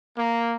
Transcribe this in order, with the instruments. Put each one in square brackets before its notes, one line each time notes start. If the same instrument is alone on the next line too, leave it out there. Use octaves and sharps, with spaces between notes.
[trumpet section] A#3